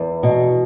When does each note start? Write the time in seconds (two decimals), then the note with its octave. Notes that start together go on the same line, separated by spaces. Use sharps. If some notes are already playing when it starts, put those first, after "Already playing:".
Already playing: E2
0.23 B2